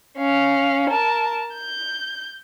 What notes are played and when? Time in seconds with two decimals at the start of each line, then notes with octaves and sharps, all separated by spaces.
0.18 C#4 F5
0.90 A#4 A5
1.55 G6